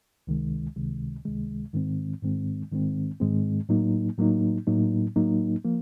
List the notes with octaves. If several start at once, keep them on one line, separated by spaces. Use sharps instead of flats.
C#2 C3 D#3 G#3
C#2 C3 D#3 G#3
C#2 C3 D#3 G#3
G#2 D#3 G#3 C4
G#2 D#3 G#3 C4
G#2 D#3 G#3 C4
G#2 D#3 G#3 C4
A2 F#3 A#3 D#4
A2 F#3 A#3 D#4
A2 F#3 A#3 D#4
A2 F#3 A#3 D#4
F3 A#3